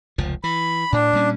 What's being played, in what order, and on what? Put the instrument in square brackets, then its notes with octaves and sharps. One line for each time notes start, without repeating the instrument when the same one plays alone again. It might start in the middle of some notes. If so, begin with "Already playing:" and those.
[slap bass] F1 C#2 F3
[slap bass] E3 [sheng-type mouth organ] B5
[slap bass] A2 [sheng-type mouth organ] D4
[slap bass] A#2 G3 C#4